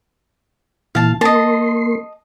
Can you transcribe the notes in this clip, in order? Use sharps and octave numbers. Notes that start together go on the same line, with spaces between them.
A#2 E3 F5 A5
A#3 D#5 A5 C6